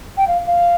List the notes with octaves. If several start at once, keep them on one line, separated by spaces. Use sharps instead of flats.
G5
F5
F5